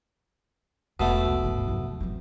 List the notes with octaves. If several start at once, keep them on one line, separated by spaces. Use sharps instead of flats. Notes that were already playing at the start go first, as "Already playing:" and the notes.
E1 B2 A3
B1
C#2 G2
F1 F#2
E3 C4